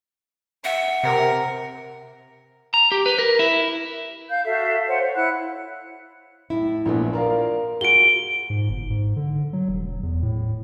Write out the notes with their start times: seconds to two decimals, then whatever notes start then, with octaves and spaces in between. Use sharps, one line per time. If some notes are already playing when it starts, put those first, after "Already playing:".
0.64 E5 F#5
1.03 C3 A#4
2.74 A#5
2.92 G4
3.06 B4
3.19 A#4
3.39 E4
4.30 F5 G6
4.45 F#4 A4 E5 F5
4.88 C5 C#5 F5 F#5
5.01 C5 C#5
5.15 E4 F#5 F#6
6.50 A2 E4
6.86 A#1 F3 A3 B3
7.13 F4 A#4 D5 F5
7.81 F4 F#4 G#4 D7 G7
8.50 G#2
8.69 G1
8.90 G#2
9.16 D3
9.53 F#3
9.68 E1
10.03 E2
10.23 A2